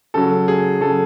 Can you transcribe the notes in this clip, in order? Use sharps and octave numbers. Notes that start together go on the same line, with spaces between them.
C#3 F#3 A4
G#4
C#3 F#3 A4